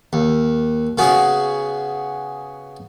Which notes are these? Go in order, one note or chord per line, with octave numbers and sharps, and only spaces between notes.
D#2
C#3 B3 F#4 G#4